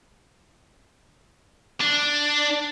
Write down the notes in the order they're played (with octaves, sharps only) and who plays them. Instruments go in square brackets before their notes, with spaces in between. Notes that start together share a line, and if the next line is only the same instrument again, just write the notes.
[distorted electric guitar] D4